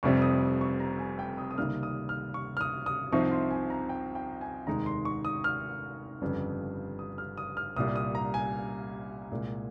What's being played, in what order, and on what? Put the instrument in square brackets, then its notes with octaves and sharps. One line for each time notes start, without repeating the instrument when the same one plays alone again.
[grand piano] F1 F2 C3 G3 C4 C#6
D#6
C#6
A#5
G#5
G5
D#6
D#6
C#2 C3 D#3 G3 A#3 F6
D#6
F6
C#6
F6
D#6
D#6
C2 C3 F3 C4 D#4 C#6
C6
G#5
A#5
G5
G5
G#5
F1 D#2 D#3 G#3 D#4 A#5
C6
C#6
D#6
F6
G1 F2 C#3 G3
D#6
F6
D#6
F6
C2 A#2 G3 D#6
D#6
A#5
G#5
C2 A#2 G#3